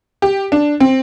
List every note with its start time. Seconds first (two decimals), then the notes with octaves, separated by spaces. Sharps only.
0.22 G4
0.52 D4
0.80 C4